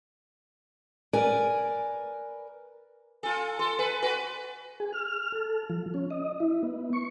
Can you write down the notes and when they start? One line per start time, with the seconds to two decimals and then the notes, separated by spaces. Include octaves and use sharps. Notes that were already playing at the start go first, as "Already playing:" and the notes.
1.13 A#4 B4 D5 G#5
3.23 F4 A4 G#5
3.59 A4 C6
3.79 B4 G#5
4.02 F#4 B4
4.80 G#4
4.93 F6
5.32 A4
5.70 F3
5.94 C#4
6.10 D#5
6.40 E4
6.63 B3
6.93 C#6